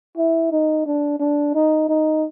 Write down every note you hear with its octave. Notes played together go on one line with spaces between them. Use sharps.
E4
D#4
D4
D4
D#4
D#4